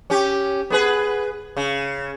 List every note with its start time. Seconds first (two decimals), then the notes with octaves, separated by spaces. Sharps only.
0.10 C#4 G4
0.70 B3 G#4 B4
1.57 C#3